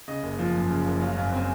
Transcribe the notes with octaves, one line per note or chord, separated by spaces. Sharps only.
C#3 D#5
F#1
F3
F#2
C#3
F#1
F#3 F5
F5
F#2
C4 G#5